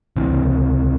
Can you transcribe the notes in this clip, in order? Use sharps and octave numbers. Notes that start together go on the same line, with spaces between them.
C#2 C3 E3